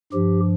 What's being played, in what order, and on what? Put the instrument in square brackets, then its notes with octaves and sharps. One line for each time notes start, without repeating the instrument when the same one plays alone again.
[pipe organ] G2 F3 G4